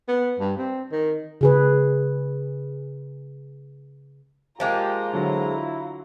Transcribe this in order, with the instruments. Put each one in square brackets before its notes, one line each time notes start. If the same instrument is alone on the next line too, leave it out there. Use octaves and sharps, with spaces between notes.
[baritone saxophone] B3
G2
C4
D#3
[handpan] C#3 G#4 B4
[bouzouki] F3 G#3 A#3 [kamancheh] F4 A#5 [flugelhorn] G4
[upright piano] D3 F#3 [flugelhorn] E4